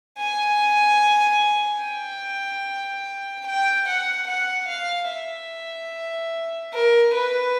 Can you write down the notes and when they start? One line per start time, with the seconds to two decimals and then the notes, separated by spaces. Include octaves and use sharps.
0.19 G#5
1.82 G5
3.45 G5
3.87 F#5
4.27 F#5
4.68 F5
5.10 E5
6.73 A#4
7.14 B4